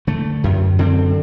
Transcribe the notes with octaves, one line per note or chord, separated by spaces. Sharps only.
D3 A3
F#2
D3 C4